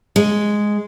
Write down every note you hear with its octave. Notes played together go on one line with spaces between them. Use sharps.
G#3